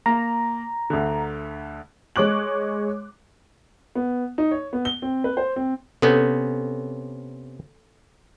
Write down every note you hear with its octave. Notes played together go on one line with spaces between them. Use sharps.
A#3 A#5
D2 D3
G#3 C#5 D6 F#6 F#7
B3
D#4
C#5
B3
G7
C4
B4
C5
C4
C3 B3 C#4 A4 C#5